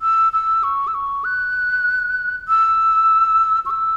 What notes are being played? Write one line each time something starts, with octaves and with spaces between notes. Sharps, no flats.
E6
E6
C#6
E6
C#6
F#6
E6
C#6
E6